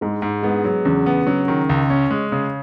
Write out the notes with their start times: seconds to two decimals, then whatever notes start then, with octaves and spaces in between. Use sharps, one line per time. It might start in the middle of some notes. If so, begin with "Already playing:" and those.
0.01 G#2 G#3
0.22 G#2
0.43 G#3 B3
0.64 F#3
0.85 E2 C#3
1.06 B3
1.27 C#3 F#3
1.48 D#3
1.69 C#2
1.90 C#4
2.11 G#3
2.32 C#3